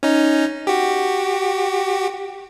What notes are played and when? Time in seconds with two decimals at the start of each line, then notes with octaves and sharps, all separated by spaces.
0.03 C#4 D#4
0.67 F#4 G4